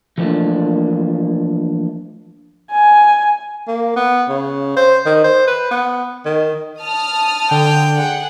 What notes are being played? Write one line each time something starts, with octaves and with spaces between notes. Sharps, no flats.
E3 F3 G3 A3 A#3 D4
G#5
A#3
B3
C#3
C5
D#3
C5
B4
B3
D#3
A5 D#6 F6
D3 G5
G#4 F#5